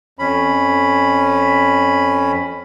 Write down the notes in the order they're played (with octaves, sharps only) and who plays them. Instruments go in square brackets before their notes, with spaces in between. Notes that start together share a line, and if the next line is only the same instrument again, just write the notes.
[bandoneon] F2 C#4 B5